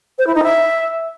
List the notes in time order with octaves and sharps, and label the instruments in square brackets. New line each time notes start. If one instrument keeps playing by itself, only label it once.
[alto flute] C5
E4
D#4
E5